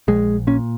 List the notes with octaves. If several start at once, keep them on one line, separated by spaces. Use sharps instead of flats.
A#1 G#3
A#2 C#4